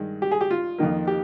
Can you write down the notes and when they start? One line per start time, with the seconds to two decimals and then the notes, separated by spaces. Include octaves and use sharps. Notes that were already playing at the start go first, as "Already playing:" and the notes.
Already playing: G2 D#3 G#3
0.22 G4
0.31 G#4
0.41 G4
0.51 F4
0.78 F2 D#3 A#3
1.07 G4